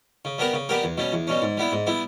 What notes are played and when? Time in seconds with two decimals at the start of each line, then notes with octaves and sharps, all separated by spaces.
0.25 C#3
0.38 G3 B3 G4 A#4
0.53 C#3
0.69 G3 B3 G4 A#4
0.83 E2
0.98 B2 G3 C#4
1.12 E2
1.27 B2 G3 C#4
1.42 G#2
1.57 G3 B3 E4
1.72 G#2
1.87 G3 B3 E4